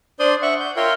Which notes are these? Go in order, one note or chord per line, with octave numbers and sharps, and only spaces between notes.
D4 C5 D5 C6 D#6
E5 F#5 C#6
G6
F4 A#4 C#5 E5 G5 C6